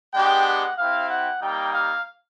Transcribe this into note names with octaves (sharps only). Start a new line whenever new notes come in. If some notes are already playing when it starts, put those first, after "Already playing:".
G#3 B3 D4 G4 G5
F#5
C4 E4 G4 F5
F#5
G3 A#3 D#4 G5
F5